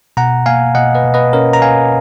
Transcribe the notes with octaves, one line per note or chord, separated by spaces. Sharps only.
B2 F#5 A#5
A#3 F5 G#5
B2 D#5 F#5
B4 D#5
B2
B4 D#5
C#4 A#4 C#5
A#5
C#4 F5 G#5